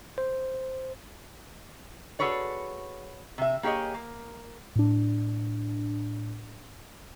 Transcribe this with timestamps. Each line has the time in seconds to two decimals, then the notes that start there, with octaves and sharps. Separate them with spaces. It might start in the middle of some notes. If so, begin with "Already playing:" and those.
0.18 C5
2.19 F#4 G#4 A4 B4 C#5 D5
3.38 C3 E5
3.63 A#3 G4 G#4 C#5 D#5
3.94 A#3
4.76 A2 D4